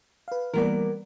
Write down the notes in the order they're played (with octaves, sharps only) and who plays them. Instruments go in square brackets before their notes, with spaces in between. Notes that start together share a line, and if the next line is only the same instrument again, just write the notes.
[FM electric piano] B4 F5
[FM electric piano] E3 G3 D5 [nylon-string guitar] A#3 B3 A#4